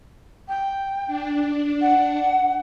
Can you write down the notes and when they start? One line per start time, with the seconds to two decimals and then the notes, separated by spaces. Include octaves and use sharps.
0.48 G5
1.06 D4
1.81 F#5